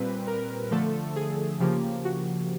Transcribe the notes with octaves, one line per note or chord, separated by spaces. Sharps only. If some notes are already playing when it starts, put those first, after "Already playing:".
Already playing: A#2 G3 C4 B4
A#4
D3 F3 A3 A4
G#4
C#3 F3 A#3 G4
F#4